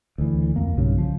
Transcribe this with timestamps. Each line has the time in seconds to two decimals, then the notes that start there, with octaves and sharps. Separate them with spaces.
0.18 D2 E3
0.56 F2 A#3
0.77 B1 G2 C#3
0.98 F3